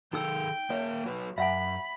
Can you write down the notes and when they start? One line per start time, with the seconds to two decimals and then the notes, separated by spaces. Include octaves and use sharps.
0.13 D#3 D#4 G#4 A4 G5 E6
0.70 A#3 A#4 C#5 E5
1.06 F#3 F#4 B4
1.38 F#2 E5 F#5 G#5 B5